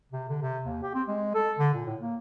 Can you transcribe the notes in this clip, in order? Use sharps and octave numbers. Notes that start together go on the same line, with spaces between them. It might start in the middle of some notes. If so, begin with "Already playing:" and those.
C3
D3
C3
D#2
G4
C4
G#3
A4
D3
A#2
A2
A#3